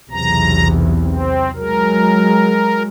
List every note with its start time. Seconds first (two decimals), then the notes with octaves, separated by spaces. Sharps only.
0.11 B1 E2 C3 A#5
1.04 C4
1.56 F#3 G#3 A#4